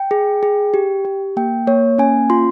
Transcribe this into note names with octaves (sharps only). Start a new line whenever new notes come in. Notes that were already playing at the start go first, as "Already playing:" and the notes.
Already playing: G5
G#4
G#4
G4
G4
A#3 G5
A#3 C#5
C#4 G#5
F4 C6